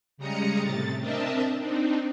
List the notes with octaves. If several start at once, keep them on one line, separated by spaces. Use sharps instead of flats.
C#3 G3 G#3 A#5 D#6 C#7
A2 C3 A6
C4 D4 A#4 D#5 E5 A5
C4 D4 D#4